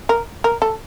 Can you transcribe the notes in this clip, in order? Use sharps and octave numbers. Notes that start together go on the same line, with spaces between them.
A#4
A#4
A4